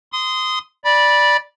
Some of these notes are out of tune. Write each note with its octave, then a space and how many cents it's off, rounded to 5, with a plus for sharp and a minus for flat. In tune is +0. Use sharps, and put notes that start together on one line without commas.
C6 -20 D#6 +0
D5 +0 B5 -20